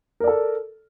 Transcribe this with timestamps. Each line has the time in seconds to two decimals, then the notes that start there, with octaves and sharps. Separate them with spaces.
0.20 A#4
0.24 D5
0.27 A4